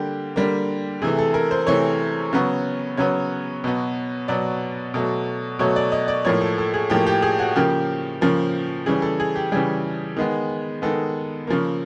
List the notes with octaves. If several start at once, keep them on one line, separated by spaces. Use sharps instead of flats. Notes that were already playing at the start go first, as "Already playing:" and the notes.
Already playing: D3 G3 A#3 G4
D3 G3 A#3
C3 E3 A3 G#4
A4
A#4
C5
C3 E3 A3 C#5
C#3 F#3 B3
C#3 F#3 B3 C#5
B2 F#3 B3
B2 F#3 B3 D5
B2 F#3 A3
B2 F#3 A3 C#5
D5
D#5
D5
A2 F3 A#3 C#5
A4
A4
G#4
A2 F3 A#3 G4
G4
G#4
F#4
C#3 F3 A#3 G4
C#3 F3 A#3
C#3 E3 G3 G#4
A4
G#4
G4
C#3 E3 G3 G#4
D#3 G#3 B3
D#3 G#3 B3 A4
C#3 F3 A#3